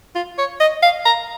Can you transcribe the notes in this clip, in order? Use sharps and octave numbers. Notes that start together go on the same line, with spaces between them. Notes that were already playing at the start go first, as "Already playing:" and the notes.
F4
C#5
D#5
F5
A#5